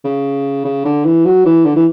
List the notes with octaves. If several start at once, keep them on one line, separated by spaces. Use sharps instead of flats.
C#3
C#3
D3
E3
F#3
E3
D3
E3